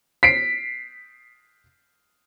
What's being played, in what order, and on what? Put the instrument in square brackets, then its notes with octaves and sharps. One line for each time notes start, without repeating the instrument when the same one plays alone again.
[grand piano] B6 C7 D7